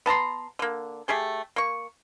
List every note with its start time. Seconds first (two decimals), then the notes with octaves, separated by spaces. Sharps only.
0.06 B3 A5 A#5 C6
0.59 D3 A#3
1.08 A3 G4 G#4 G5
1.56 A#3 C#6